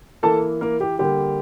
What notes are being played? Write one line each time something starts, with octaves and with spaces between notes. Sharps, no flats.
E3 A#3 A4 A5
A#3 A#4
G4
D3 G3 A#3 G4